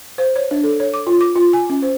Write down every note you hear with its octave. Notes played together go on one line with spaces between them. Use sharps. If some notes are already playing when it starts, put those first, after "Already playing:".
C5
C#5
D4
A4
C#5
D6
F4
D6
F4
G#5
C#4
C5